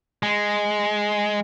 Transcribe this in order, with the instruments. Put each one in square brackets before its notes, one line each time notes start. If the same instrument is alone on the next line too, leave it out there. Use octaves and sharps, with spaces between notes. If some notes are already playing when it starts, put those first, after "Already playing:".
[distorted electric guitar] G#3